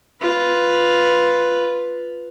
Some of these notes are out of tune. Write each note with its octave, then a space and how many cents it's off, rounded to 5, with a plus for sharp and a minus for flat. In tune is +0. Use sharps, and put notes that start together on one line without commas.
F4 +0 B4 +0